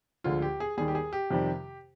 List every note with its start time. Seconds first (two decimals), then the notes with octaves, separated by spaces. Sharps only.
0.24 D2 D3 F3 G#3 F4
0.42 G4
0.60 G#4
0.78 D#2 D#3 G3 G#4
0.88 G4
0.95 G#4
1.13 G4
1.31 F2 C3 D#3 G3